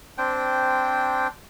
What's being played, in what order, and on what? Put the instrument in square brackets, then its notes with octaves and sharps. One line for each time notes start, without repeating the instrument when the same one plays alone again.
[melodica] C4 D4 C5 G5